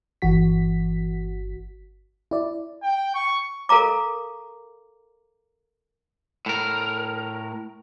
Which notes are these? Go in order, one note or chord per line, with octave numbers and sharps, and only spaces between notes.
G1 E3 F#4 B6
E4 D5
G5
C#6
A4 A#4 F5 A#5 D6
A2 A#4